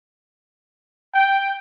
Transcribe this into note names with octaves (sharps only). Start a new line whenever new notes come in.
G5